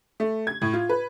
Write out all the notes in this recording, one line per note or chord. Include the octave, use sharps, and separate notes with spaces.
A3
G#6
A2
F4
B4